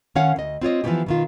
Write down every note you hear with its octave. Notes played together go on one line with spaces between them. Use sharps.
D#3 C#4 C#5 F5 F#5
D2 D#5
C4 F4 C#5 D#5
E3 F3 G3 B3 C#4 G4
B2 D#3 F4